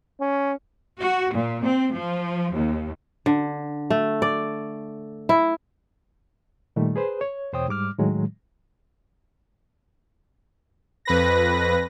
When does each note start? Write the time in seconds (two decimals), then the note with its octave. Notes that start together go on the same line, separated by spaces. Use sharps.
0.20 C#4
1.01 F#4
1.33 A#2
1.63 C4
1.95 F3
2.54 D#2
3.26 D3
3.90 A3
4.22 D5
5.29 E4
6.76 A#2 D#3 G3 A3
6.96 G#4 B4 C5
7.21 C#5
7.53 E2 B2 C5 C#5 G5 D#6
7.68 G#2 G3 D6 F6
7.98 A2 D#3 F#3 G#3
11.05 F2 B4 A#6